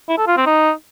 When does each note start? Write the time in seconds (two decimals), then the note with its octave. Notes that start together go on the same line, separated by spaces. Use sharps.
0.09 E4
0.18 A4
0.27 F4
0.37 C4
0.46 D#4